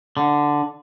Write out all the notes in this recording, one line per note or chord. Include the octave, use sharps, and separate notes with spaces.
D3